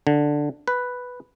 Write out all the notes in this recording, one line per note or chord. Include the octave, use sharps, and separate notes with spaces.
D3
B4